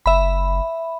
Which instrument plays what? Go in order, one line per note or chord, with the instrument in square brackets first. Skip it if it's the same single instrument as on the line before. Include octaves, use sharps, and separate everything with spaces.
[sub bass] F#1 [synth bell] E5 B5